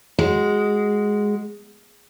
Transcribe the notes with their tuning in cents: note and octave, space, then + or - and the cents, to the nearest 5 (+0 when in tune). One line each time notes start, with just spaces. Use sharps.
G#3 +0 F#4 +0